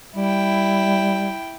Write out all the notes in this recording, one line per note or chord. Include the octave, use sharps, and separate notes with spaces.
G3 E4 G5